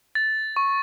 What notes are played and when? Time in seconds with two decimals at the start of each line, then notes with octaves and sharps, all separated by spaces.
0.15 A6
0.56 C#6